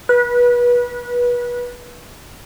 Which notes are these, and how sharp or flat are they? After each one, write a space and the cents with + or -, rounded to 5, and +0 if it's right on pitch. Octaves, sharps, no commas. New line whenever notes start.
B4 -30